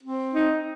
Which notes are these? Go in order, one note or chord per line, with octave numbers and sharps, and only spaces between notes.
C4
D#4